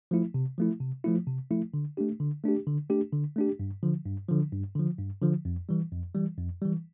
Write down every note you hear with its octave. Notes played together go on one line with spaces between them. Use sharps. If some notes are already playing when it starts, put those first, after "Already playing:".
F3 A3 E4
C3
F3 A3 E4
C3
F3 A3 E4
C3
F3 A3 E4
D3
A3 D4 G4
D3
A3 D4 G4
D3
A3 D4 G4
D3
A3 D4 G4
G2
D3 F3
G2
D3 F3
G2
D3 F3
G2
D3 F3
F2
E3 G3
F2
E3 G3
F2
E3 G3